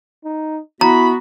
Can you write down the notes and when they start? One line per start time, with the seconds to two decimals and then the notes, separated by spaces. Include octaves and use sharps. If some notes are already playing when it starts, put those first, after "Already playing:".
0.25 D#4
0.81 B3 E4 F#4 A#5 B5